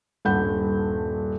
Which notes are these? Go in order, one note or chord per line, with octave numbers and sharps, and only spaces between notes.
D#1 G2 F#5 B5 G6